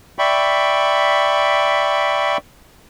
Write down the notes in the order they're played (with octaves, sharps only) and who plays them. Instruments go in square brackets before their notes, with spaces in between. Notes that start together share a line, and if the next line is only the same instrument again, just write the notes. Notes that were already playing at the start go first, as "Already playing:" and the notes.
[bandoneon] D5 E5 G5 B5 C#6